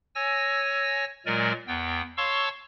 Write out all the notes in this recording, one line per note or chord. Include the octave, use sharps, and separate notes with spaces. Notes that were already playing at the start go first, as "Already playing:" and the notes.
C#5 G#5 E6 A#6
A#2 F#3 G#3 A#4 D5 G#5
E2 B3 G5
C#5 F5 A5 C6 C#6 E6